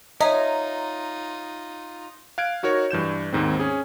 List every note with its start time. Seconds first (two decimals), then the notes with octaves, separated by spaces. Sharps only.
0.21 D#4 F4 C#5 D#5 E5 A#5
2.38 F5 F#6 G#6 D7
2.63 D#4 F#4 A#4 C#5
2.91 G2 E3 G6 E7
3.33 D#2 G#2 D#3 C4
3.60 C#4 G#4